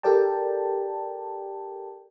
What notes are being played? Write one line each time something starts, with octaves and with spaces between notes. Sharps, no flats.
G4 A4 A#4 D5 G5 A5